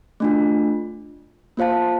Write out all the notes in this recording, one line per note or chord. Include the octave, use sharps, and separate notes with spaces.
A3 D4 F4
A#3 F4 C5 F5 A5